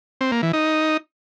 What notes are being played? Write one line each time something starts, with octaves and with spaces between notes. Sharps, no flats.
C4
A#3
E3
D#4